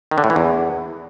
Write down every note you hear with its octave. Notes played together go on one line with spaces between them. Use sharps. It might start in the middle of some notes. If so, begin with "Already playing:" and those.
D#3
D3
A2
E3
E2